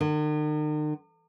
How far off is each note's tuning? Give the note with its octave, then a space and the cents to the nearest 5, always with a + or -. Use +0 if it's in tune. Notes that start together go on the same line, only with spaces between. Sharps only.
D#3 -45